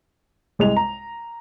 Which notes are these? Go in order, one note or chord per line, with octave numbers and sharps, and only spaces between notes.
C2 G#3 F7
A#5